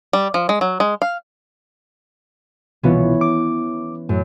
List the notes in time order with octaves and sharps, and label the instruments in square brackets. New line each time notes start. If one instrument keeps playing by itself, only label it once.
[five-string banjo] G3
F3
G#3
F#3
G#3
F5
[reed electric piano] C2 B2 F4 [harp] E3 B3 C#4
[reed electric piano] D6
[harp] F#2 [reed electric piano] A2